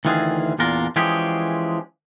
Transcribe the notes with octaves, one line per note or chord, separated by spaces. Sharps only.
D2 D#3 E3 F4 G#4
E2 A#2 D4 F4 A#4
E3 F3 G#3 C#4 G4 G#4